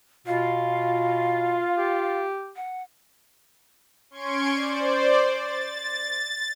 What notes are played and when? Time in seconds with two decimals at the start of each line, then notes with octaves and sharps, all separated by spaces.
0.27 B2 F4 F5
1.77 G4
2.56 F#5
4.10 C#4 C6 C#6 G#6 D7
4.53 C5 D5
5.32 A6